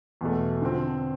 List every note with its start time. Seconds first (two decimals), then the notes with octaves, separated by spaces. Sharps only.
0.21 E2 B2 A3
0.62 D3 F3 C4